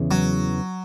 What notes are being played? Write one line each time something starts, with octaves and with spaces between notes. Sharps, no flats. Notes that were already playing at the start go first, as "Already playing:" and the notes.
Already playing: E2 C#3 E3
F#3